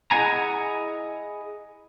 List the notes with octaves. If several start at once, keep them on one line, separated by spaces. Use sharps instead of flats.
E4 G#4 D#5 F#5 G#5 A#5